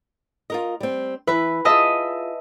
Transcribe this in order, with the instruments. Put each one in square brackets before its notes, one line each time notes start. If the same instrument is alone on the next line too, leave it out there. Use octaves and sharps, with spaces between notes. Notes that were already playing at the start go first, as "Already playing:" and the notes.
[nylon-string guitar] F4 A#4 D#5
G3 C4
[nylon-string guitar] E3 E5 [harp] B4
[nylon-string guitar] F4 G#4 [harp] D#5 E5 A5